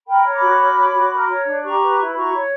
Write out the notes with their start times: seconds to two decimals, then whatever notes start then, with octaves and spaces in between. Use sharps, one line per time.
0.06 A#4 G5 B5
0.23 C#5
0.32 B5 D6
0.41 F#4
0.58 A#4
0.75 C#5
0.94 F#4
1.11 A#4
1.29 C#5
1.46 D4
1.63 G4 A#5 C#6
1.81 B4
1.98 E4
2.08 B5
2.15 F#4 A#5 C#6
2.33 C#5